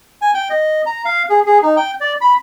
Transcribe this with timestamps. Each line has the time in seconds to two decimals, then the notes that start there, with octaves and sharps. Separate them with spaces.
0.22 G#5
0.34 G5
0.50 D#5
0.86 A#5
1.05 F5
1.30 G#4
1.46 G#4
1.62 D#4
1.77 G5
2.00 D5
2.21 B5